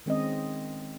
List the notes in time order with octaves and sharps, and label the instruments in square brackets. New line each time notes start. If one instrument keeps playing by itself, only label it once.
[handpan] D#3 G#3 C4 C#4 D#5